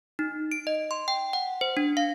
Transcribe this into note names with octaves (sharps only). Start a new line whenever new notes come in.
D#4
D7
D#5
C6
G5
F#5
C5
D4
F5